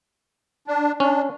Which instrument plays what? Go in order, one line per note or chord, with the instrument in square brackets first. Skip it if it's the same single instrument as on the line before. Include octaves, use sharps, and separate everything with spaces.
[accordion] D4
[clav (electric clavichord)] C#4 [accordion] D4